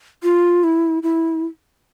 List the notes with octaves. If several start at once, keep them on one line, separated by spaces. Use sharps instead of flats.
F4
E4
E4